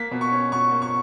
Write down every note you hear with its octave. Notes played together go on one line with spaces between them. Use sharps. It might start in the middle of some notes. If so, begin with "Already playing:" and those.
Already playing: A#3 B6
B2
C#6
C#4
B2 C#6
A#3
C#6